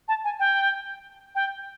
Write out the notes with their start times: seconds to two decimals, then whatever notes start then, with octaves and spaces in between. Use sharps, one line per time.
0.08 A5
0.24 G#5
0.39 G5
1.35 G5